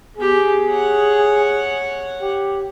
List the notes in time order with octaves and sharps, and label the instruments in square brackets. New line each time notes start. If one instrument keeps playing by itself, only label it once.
[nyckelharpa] B3 G4 [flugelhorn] G#4
[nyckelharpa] C#5 F#5
[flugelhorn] G4